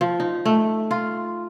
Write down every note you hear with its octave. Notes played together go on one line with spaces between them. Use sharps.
F3
D#4
A3
F4